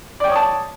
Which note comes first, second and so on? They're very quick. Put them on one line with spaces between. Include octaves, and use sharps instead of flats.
D5 G5 C#5 D#6 A5